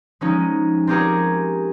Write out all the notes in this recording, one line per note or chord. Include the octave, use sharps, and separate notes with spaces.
F3 G#3 C#4 D#4
C4 F4 G4 G#4 A#4 C#5